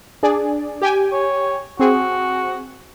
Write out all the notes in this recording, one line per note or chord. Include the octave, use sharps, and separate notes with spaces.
D4 G#4 D5
G4 G5 G#5
C#5
C4 F#4 G#4